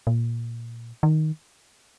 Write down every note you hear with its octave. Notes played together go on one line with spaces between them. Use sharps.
A#2
D#3